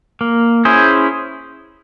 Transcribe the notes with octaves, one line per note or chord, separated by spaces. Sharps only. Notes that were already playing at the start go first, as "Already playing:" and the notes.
A#3
C#4 E4 G#4 C5